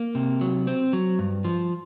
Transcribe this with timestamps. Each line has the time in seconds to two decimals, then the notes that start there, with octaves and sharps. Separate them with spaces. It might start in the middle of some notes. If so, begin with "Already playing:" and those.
Already playing: A#3
0.15 C3
0.41 F#3
0.67 C4
0.93 F#3
1.19 G2
1.44 F3